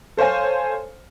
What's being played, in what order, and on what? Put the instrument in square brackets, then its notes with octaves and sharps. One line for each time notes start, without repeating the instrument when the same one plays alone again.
[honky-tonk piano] A4 C5 C#5 F5 G#5